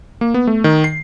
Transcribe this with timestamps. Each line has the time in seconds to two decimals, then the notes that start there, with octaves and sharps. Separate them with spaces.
0.21 A#3
0.34 B3
0.47 A3
0.64 D#3
0.84 C7